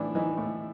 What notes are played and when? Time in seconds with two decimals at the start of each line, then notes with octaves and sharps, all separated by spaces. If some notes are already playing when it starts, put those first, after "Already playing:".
Already playing: A2 E3 D4
0.15 E3 D#4
0.37 A2